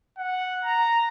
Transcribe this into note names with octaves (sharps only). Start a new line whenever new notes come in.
F#5
A#5